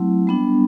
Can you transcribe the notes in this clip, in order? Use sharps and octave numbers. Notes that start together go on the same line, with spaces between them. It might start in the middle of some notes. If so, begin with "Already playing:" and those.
Already playing: F#3 A3 C4 E4
G3 B3 D4